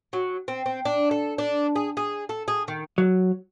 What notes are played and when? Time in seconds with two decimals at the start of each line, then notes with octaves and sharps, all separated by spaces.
0.13 F#3
0.48 C4
0.66 C4
0.85 D4
1.11 A4
1.38 D4
1.76 G#4
1.97 G#4
2.29 A4
2.48 G#4
2.68 D#3
2.98 F#3